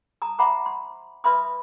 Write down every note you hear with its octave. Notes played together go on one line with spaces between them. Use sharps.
A5 A#5 D#6
C5 E5 F#5 A#5 B5 D6
C6
B4 D5 E5 B5 C6 D#6